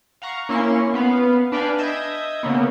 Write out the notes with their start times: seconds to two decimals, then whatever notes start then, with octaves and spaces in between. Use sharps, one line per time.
0.22 F5 F#5 A#5 C#6
0.49 A#3 C#4 E4 C6 C#6 C7
0.94 B3 B4 F5
1.52 D4 B4 D5 F5 G5 G#5
1.78 D#5 E5 G6 G#6 A#6
2.43 C#3 A#3 B3